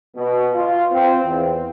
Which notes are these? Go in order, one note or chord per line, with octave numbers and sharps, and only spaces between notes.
B2
F4
C4
E2